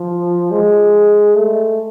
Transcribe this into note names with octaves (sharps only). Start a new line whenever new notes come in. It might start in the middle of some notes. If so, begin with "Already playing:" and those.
Already playing: F3
G#3
A3